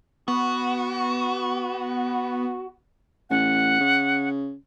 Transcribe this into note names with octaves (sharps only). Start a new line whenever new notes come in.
B3 F#4
A1 F#5
C#3